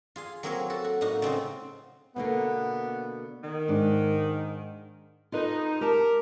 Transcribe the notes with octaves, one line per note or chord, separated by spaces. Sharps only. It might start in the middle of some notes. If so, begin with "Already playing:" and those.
F4 G#4 F5
F#3 A#3 C4 G#4 A#4 C#5
F#4 A4
F#4
A2 A#3 D#4 F#4
C#3 C4 D#4 F4
B2 D3 A#3 B3
D#3
G#2 D4
D#4 F4 A4 B4
G4 A#4 A5